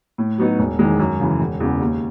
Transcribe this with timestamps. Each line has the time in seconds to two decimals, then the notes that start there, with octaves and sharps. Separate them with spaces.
0.18 A2
0.38 F#3 B3 D#4 F#4
0.58 E1
0.79 E2 D#3 G#3
0.99 F#2
1.20 C#3 E3
1.40 E1
1.60 E2 C#3
1.80 D#2